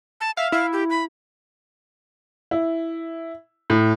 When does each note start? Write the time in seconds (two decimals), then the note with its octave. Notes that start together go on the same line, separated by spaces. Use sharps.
0.21 A5
0.37 E5 F5
0.52 E4 F5
0.73 G4
0.90 B5
2.51 E4
3.70 A2